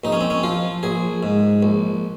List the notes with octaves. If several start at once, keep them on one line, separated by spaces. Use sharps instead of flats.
A#1 D#4
C#4
C4
C#4
F3 F4
A#1 G#4
G#2
A#1